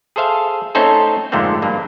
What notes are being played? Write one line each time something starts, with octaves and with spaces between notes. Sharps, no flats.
G#4 A4 C5 E5 F5
A3 C4 C#4 D#4 A4 C5
F2 G#2 D3 A3 A#3 C4
G2 A#3